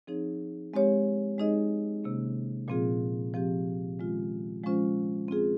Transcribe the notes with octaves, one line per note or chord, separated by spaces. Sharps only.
F3 C4 D#4 G#4 C#5
G#3 C4 G4 C#5
G#3 D#4 G#4 D#5
C3 D#3 A#3 C#4
A#2 F3 C4 F4 G#4
F3 C4 G4
D#3 G#3 C#4 F4
F3 G#3 C#4 F4 C5
C4 F4 G#4